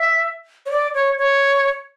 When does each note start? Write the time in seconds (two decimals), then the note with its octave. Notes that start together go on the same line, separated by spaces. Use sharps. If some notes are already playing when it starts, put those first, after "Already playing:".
Already playing: E5
0.66 C#5
0.71 D5
0.94 C#5
1.18 C#5